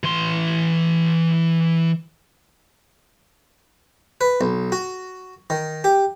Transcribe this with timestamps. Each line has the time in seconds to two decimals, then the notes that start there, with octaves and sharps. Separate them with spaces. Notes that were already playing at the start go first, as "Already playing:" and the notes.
0.04 E3 C6
4.21 B4
4.41 B1
4.72 F#4
5.50 D#3
5.84 G4